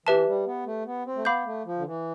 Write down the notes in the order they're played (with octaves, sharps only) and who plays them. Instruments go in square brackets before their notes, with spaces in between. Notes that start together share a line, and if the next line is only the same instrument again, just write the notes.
[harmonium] E3 [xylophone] G4 B4 E5 A5
[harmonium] G3
B3
A3
B3
C4
A3
[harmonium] B3 [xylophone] F5 B5 D6 G6
[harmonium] A3
F3
D3
E3